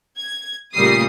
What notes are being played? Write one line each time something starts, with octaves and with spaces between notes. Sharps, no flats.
G#6
A#2 C#3 G3 A3 D#6 C7